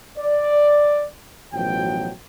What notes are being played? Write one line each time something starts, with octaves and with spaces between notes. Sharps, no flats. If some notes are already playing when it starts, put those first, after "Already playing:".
D5
A1 B2 F3 F#3 G5